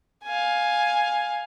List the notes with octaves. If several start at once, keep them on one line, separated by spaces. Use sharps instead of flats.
F5 G#5